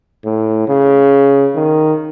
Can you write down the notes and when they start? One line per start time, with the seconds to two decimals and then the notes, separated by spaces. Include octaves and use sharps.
0.25 A2
0.68 C#3
1.55 D#3